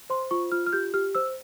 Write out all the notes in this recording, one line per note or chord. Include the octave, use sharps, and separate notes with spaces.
C5 C6
F4 C#6
F4 F6
F6
G4 G6
G4 F6
C5 E6